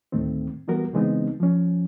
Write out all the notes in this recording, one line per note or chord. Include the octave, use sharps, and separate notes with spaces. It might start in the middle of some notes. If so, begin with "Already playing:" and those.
D2 A2 D#3 A3 C4
E3 G3 B3 F#4 A#4
C#3 E3 G#3 B3 C4 D#4
F3 C#4